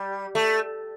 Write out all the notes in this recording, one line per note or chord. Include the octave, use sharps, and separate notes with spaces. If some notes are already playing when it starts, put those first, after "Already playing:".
Already playing: G3
A3